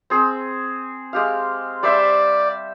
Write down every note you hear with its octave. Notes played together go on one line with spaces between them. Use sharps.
C4 G#4 C5
G#3 G4 F5
G3 C5 D5 E5